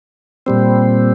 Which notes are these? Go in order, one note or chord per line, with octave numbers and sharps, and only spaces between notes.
A#2 G3 C4